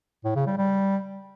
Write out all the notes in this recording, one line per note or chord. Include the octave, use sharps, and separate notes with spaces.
A2
C#3
G3
G3